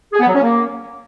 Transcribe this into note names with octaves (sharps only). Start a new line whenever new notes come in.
G#4
B3
F#3
C#4
A#3